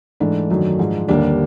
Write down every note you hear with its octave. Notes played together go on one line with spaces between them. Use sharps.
G#2 E3 A3 D4
F#2 D#3 F#3 A3
G#2 F3 G#3
D#2 D3 G3 A#3 D4